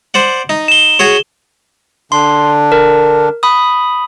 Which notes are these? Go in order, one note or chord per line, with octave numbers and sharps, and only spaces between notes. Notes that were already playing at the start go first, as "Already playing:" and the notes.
C5 D5 F#5
D#4
E7 G7
F#4 G#4 C#5
D3 D4 C6
A#4
B5 D#6